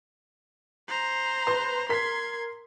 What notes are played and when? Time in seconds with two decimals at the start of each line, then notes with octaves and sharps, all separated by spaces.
0.88 C5 A#5
1.47 B4 C6
1.89 A#4 C6 G#6 B6